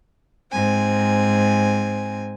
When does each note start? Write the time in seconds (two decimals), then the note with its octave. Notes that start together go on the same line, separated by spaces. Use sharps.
0.52 G#2 C4 G#5